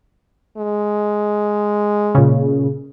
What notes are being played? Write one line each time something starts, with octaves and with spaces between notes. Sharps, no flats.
G#3
A#2 C#3